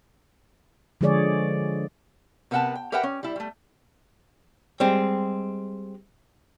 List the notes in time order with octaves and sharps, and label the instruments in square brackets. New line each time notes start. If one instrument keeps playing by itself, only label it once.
[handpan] D3 F3 G#3 G#4 C#5 D5
[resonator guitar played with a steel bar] C3 B3 A#4 F#5 G5 A5
G5
G4 A#4 B4 E5 F#5 G5
C#4
G3 E4
G3 A3
[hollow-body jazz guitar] G3 G#3 C4